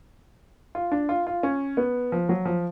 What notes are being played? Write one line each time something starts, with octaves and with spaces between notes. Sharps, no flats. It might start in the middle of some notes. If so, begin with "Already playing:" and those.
F4
D4
F4
F4
C#4
B3
F3
F#3
F3